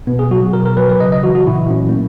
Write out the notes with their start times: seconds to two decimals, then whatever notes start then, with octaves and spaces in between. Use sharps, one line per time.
0.07 B2 B3
0.19 G#4
0.31 F#3 F#4
0.53 B2 A#4
0.66 A#4
0.77 F#3 B4
0.89 B4
1.00 C#3 D#5
1.12 D#5
1.23 E3 F#4
1.35 F#4
1.47 A#2 E4
1.70 F#3 C#4
1.89 A#3